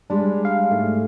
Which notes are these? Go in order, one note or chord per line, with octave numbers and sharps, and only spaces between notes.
G3 G#3 D4
F5
G#2 A3